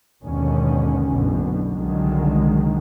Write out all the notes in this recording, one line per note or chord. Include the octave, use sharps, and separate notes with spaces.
D#2 G#2 B2 D3 D#3 C#4
F#1 B1 B2 D3
C2 D3 D#3 F#3 G#3